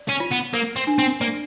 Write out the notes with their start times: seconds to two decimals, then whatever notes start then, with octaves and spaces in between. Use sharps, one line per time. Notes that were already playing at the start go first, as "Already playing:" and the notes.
Already playing: D5
0.09 C#4
0.20 F4
0.32 B3
0.54 A#3 A#4
0.76 C4
0.87 D4
0.98 C4
1.21 A#3 D5